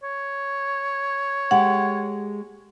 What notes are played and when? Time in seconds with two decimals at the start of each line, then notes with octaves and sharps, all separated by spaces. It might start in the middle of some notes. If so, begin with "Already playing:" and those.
0.03 C#5
1.51 G#3 G4 A4 F#5